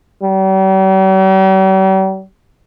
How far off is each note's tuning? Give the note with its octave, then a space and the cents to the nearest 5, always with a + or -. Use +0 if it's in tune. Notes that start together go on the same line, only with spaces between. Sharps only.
G3 -45